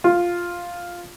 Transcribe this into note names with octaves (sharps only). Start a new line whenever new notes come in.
F4